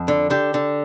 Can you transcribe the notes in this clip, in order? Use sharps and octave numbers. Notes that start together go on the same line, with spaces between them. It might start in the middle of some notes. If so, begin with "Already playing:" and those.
Already playing: F2
D3
D3 G4
D3